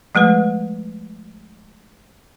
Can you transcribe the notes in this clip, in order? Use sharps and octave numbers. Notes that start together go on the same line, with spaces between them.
F3 G#3 A3 B4